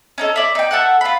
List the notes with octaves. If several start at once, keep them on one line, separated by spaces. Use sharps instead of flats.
C#4 D#4 A4
E4 D5
D#4 G5
A4 E5 F#5
F4 B5